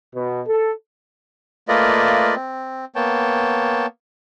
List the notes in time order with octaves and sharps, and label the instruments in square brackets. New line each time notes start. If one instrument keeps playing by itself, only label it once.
[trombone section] B2
A4
[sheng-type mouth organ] A3 A#3 F4 B4 D5 D#5
C4
A#3 B3 C#5 G5 A5